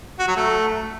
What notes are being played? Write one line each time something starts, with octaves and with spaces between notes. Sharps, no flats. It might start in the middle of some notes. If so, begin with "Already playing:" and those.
F#4
F#3
A3